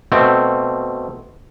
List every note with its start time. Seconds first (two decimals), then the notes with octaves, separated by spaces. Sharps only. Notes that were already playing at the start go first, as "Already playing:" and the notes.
0.12 B2 A3 C4